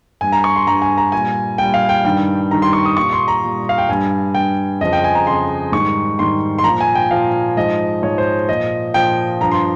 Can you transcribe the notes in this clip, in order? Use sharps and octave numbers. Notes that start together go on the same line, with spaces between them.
G2 G3 G#5
A#5
C#6
C6
G2 G3 A#5
G#5
A#5
A#2 G3 G#5
A#2 G3 G5
F5
G5
G2 D#3 G3 G5
G2 D#3 G3 A#5
C6
C#6
D#6
A#2 G3 C#6
C6
A#5
A#2 G3
F5
G5
G2 G3 G#5
G2 G3 G5
F2 C#3 F3 D#5
G5
G#5
A#5
F2 C#3 F3 C6
G#2 D#3 G3 C#6
G#2 D#3 G3 C6
C6
A#2 F3 A#5
G#5
G5
A#2 F3 F5
G#2 F3 D#5
G#2 F3 C#5
C5
A#2 F3 D#5
A#2 F3 G5
G2 F3 A#5
C6